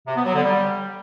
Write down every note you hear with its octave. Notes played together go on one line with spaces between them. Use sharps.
C3
B3
F#3
D3
G3